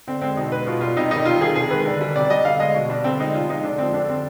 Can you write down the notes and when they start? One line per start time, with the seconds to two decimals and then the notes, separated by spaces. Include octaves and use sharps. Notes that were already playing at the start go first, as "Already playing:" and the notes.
0.07 D3 C4
0.21 G#3 C4
0.36 B2 D#4
0.52 G#3 B4
0.67 B2 F4
0.81 G3 F4
0.96 C3 D#4
1.11 D#3 G3 D#4
1.26 C3 F4
1.41 D#3 G3 G#4
1.56 C3 G#4
1.70 D#3 G#3 B4
1.86 D3
2.01 G3
2.16 C3 D5
2.30 G3 D#5
2.45 D3 F5
2.60 G#3 D#5
2.75 B2
2.89 G3 D4
3.04 D3 C4
3.19 G#3 D#4
3.34 C3 F4
3.50 F3 G#3 D#4
3.63 D3 D4
3.78 F3 G#3 C4
3.93 D3 D4
4.08 G3 C4